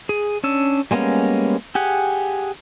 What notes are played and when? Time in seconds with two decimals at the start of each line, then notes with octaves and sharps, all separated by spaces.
0.09 G#4
0.44 C#4 D4 E6
0.91 G3 G#3 A#3 B3 C#4
1.75 G4 G#4 F#5